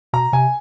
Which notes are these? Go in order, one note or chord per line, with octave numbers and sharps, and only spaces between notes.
B2 A#5
C3 G#5